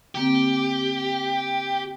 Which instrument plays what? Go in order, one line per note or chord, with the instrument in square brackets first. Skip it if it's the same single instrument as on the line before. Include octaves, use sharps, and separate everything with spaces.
[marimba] D3 A#3 C4 [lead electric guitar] G4